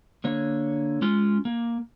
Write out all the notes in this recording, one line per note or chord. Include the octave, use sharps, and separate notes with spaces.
D3 A#3 C#5
G#3 C#4 F4
A#3